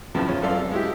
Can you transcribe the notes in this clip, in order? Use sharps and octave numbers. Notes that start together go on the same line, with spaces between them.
E2 A2 C#3 F3
C#4 F4
F#2 E3 A4 D5 F5 C6
C3
G#3 E4 G4